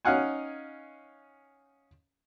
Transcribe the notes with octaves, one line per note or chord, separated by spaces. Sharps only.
C#4 D#4 F5 F#5 G#5